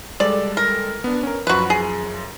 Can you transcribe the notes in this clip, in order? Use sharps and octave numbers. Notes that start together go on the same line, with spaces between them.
G3 G#3 A4 D5
A#4
B3 D4
C#4 A#4
F#2 F3 F#4 B4
G#4